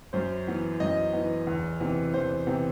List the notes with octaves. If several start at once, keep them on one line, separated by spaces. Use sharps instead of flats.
F#2 C5
E3 B3
F#2 D#5
E3 B3
E2
C3 E3 B3
E2 C5
C3 E3 B3